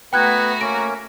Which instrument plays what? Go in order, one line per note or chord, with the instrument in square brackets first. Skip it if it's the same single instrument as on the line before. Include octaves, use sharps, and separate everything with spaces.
[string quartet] A3 F#4 A#5 [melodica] B3 B4 [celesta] G5 F#6 G#6
[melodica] A#3 C#4 [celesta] D7